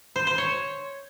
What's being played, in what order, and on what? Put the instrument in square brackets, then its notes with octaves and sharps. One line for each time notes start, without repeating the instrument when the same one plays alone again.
[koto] C5
C5
C#5